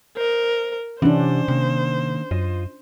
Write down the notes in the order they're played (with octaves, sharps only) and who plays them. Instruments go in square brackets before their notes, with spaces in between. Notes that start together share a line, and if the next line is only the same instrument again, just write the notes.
[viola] A#4 [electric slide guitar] C5 D#5
[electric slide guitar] C3 G4 F#5 [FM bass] E3 [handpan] C#4 D4 [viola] C5
[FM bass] C3 [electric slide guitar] D#3 A#3
[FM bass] F#2 [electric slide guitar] F4 D#5